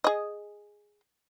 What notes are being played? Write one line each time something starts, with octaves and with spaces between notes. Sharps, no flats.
G#4 D#5